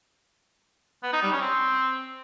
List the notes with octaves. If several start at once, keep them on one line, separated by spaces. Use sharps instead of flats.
B3
D#4
G3
C#4
C4